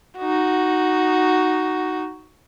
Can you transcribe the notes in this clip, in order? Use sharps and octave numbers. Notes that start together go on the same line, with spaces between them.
D#4 F#4